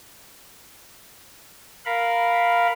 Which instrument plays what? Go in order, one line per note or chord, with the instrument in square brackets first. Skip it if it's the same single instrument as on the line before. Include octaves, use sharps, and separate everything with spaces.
[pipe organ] A#4 F5 B5